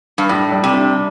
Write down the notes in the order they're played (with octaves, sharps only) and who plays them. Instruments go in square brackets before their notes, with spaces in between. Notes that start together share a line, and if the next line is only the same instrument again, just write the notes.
[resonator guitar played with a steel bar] G2
[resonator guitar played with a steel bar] A2 [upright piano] G3
[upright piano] G3
[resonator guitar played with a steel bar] C3
[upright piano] D4